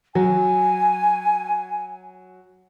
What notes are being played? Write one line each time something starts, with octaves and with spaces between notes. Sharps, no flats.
F#3 G#5